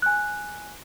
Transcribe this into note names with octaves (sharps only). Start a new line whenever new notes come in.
G#5 F#6